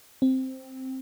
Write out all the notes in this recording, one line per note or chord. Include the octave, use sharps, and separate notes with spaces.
C4